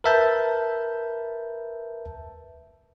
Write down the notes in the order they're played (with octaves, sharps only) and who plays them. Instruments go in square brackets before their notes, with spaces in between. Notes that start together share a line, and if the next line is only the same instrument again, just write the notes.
[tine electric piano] A#4 B4 E5 A5 G6